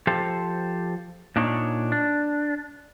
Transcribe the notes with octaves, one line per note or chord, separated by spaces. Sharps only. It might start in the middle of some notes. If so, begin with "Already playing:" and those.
F3 G4 A4 C5
A#2 D4 D#4 C#5
D4